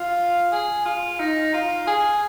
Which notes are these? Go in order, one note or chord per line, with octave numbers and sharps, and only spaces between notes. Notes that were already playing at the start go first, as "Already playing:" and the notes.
Already playing: F4
G#4
F4
D#4
F4
G#4